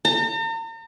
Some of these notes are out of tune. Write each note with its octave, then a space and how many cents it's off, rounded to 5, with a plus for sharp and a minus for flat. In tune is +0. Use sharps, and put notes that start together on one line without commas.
A#5 -45